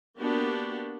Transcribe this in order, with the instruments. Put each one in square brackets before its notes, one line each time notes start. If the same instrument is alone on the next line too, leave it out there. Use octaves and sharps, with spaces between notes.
[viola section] A#3 B3 D4 F#4 G4